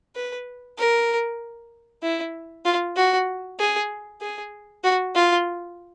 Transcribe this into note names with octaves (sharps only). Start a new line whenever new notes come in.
B4
A#4
E4
F4
F#4
G#4
G#4
F#4
F4